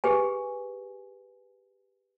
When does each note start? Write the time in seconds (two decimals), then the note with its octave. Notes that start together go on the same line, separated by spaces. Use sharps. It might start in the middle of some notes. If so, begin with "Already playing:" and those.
0.04 G4 G#4 B4 G#5